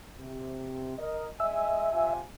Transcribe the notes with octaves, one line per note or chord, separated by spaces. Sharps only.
C3
A#4 D#5
G#3 D#5 E5 G#5
C3 F4 G#5